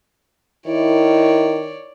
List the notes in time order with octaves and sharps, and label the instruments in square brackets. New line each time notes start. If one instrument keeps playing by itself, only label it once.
[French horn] D#3 [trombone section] E4 [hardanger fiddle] C#5 D5